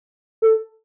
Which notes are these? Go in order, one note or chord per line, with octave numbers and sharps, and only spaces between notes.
A4